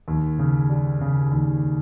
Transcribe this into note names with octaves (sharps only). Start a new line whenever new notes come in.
D#2
C#3
G3
C#3
D#2